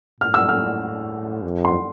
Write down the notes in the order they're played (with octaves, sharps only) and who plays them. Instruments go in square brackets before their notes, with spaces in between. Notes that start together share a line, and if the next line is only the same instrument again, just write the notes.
[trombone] A2 [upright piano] F6
[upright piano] E6
F6
[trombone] F2
[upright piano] C6